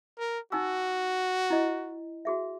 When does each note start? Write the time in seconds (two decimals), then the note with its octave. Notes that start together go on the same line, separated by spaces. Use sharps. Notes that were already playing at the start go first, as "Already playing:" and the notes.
0.19 A#4
0.52 D#4 F#4 G#5 E6
1.50 E4 D#5
2.25 F#4 G#4 E5